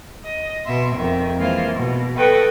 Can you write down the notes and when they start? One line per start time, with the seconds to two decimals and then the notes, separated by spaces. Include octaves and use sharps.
0.24 D#5
0.64 B2 E5 C6
0.96 F2 D#3 E5
1.37 E3 G#3 A#3 F4 C5
1.73 B2
2.16 A4 B4 D#5 G5 C#6